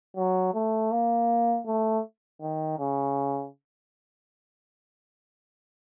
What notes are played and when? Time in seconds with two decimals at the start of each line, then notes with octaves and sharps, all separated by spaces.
0.17 F#3
0.54 A3
0.92 A#3
1.66 A3
2.42 D#3
2.79 C#3